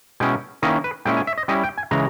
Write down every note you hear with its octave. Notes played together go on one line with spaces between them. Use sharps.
B2 G#3 C#4 E4 G5
D#3 A#3 C#4 E4 D#5
B4
A#2 G#3 C#4 E4 G5
G#5
E5
D#5
G3 C#4 E4 D#5
G5
G#5
C#3 E3 G#3 A#5